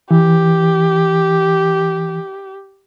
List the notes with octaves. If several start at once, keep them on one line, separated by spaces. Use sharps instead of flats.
E3 G4